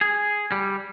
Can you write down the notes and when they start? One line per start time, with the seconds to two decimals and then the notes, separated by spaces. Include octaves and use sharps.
0.01 G#4
0.52 G3